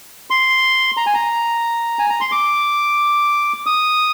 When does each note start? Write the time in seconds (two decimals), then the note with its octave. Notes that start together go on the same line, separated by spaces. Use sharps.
0.30 C6
0.97 A#5
1.06 G#5
1.14 A#5
1.99 G#5
2.10 A#5
2.21 C6
2.32 D6
3.66 D#6